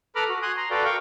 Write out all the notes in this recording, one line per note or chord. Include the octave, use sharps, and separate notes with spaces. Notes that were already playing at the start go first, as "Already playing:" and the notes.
A4 B4 A#5 B5 D6 F6
F#4
G#5 C6 D#6 F#6
A#5 C6
F#4 A4 B4 D5 F5 G5
A#4 F5 G5 C#6